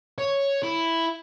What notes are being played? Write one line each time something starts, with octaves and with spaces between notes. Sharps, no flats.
C#5
E4